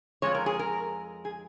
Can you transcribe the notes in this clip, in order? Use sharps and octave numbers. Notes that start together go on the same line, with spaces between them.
F2 D#3 G#3 C#5
A#4
G#4
A#4
G#4